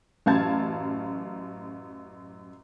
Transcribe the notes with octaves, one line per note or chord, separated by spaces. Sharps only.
A1 F#2 F5 A5 G#6 A6